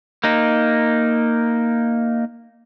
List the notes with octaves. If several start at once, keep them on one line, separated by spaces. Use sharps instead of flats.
A#3 D#4